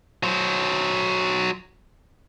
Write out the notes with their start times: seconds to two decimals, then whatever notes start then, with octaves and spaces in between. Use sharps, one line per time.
0.23 F#3 C5